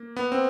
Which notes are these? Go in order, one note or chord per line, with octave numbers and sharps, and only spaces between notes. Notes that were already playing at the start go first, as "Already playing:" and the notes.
Already playing: A#3
B3
C4